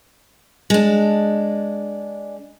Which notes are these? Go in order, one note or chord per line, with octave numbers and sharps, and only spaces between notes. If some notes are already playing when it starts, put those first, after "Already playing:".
G#3 D4